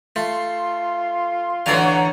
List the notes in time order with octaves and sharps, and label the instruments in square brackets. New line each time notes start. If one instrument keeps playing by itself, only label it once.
[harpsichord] A3 [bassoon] F4 [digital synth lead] C6
[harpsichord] A1 D5 F5 [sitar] D3 F#3